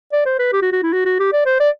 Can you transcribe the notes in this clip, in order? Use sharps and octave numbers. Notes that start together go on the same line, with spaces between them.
D5
C5
B4
G4
F#4
F#4
E4
F#4
F#4
G4
D5
C5
D5